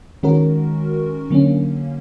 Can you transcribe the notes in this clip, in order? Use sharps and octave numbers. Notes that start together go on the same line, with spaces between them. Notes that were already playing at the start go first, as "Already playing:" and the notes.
D#3 G#3 C#4 F#4 A#4
D3 F#3 A#3 C#4